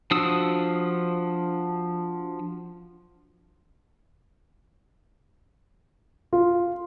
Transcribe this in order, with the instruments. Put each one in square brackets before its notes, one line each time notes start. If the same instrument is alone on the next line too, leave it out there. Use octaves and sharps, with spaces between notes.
[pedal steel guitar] F3 D4 F#4 D#6 E6
[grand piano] F4